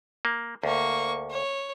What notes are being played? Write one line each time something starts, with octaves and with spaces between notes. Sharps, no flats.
A#3
D2 A#3 C#6
C#5